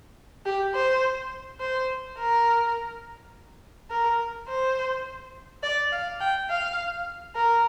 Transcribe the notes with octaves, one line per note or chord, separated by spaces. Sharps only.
G4
C5
C5
A#4
A#4
C5
D5
F5
G5
F5
A#4